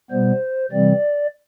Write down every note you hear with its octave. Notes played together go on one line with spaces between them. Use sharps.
B2 G3 B3 C5
C3 E3 G3 C4 D5